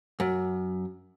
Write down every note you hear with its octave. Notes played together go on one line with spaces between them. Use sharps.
F#2